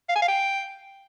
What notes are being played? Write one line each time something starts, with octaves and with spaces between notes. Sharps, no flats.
F5
G#5
F5
G5